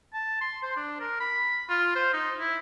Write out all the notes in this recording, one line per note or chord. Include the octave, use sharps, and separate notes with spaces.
A5
C6
C5
D4
A#4
B5
F4
C5
D#4
E4